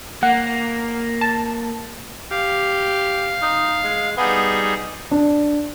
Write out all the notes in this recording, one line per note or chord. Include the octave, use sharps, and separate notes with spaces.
A#3 F#5
A5
G4 F5
D#4
G#3
G3 B3 D#4 G#4
D4